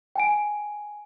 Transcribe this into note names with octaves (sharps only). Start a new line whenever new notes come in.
G5 G#5 D7